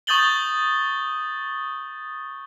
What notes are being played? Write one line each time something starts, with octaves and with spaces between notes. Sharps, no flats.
C#6 D#6 G6 A6 F#7 G7